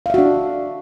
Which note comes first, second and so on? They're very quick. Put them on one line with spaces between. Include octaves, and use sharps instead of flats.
F5 E5 F#4 D4